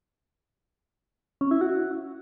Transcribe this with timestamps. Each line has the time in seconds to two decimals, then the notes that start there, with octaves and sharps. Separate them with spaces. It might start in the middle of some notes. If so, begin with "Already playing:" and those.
1.41 C#4
1.51 E4
1.61 F#4